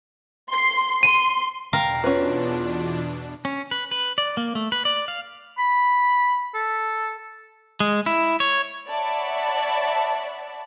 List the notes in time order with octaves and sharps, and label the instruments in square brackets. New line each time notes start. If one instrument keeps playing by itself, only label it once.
[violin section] C6 C7
[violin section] C6 [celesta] D#7
[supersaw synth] E2 B2 D4 [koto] A#4 F5 [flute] G5
[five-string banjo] C#4 B4 [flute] F4
[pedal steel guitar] C#4
B4
B4
D5
A#3
A3
B4
D5
F5
[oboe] B5
A4
[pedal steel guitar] G#3
E4
C#5
[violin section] C#5 D5 E5 F#5 A5 B5